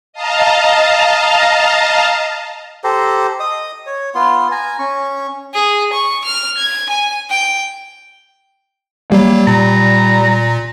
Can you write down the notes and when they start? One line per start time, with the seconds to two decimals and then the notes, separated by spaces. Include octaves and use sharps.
0.13 D#5 F5 A5 A#5
2.84 G4 A4 C5 A#5
3.40 D#5 D#6
3.86 C#5
4.15 B3 F4 C6
4.51 G#5 A#5
4.79 C#4 C#6
5.54 G#4
5.93 C#6
6.25 F6
6.58 G#6
6.90 G#5
7.30 G5
9.12 F#3 G3 A#3
9.47 A#2 A#5